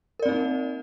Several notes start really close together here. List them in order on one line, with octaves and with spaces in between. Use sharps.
A#4 D5 C4 D#4 A#3